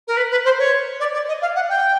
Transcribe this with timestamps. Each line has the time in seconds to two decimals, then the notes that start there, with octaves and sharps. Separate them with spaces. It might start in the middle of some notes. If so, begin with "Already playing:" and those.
0.07 A#4
0.17 B4
0.31 B4
0.45 C5
0.59 C#5
1.00 D5
1.13 D5
1.28 D#5
1.41 F5
1.55 F#5
1.69 G5